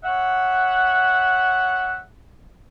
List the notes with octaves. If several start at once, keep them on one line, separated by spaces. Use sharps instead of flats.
C#5 E5 F#5